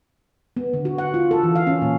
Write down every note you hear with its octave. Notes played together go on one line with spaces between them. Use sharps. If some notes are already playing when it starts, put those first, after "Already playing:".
B3
D3
F#4
F#5
F4
A4
E3
F5
C#4
A#2